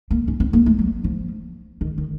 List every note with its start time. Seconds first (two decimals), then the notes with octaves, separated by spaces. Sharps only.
0.11 A#3
0.28 C#4
0.40 C4
0.53 A#3
0.66 A3
0.79 F#3
1.04 F3
1.81 D#3
1.98 D#3